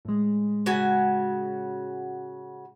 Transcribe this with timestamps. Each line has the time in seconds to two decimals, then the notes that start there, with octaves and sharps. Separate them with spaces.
0.05 A2 G#3
0.66 C#3 F#4 G#5